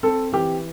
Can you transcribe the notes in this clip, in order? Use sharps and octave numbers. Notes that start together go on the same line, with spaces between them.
C4 A4
E3 G4